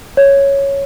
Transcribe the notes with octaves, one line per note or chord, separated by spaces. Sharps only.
C#5